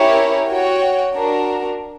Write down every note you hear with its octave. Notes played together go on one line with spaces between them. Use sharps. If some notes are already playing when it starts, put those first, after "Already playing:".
Already playing: C#4 E4 G4 A#4 C#5
F#4 C#5 G5
D4 F#4 A#4